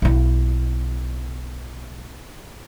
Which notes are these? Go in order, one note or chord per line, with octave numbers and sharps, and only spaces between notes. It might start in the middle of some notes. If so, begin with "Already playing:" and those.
B1 E4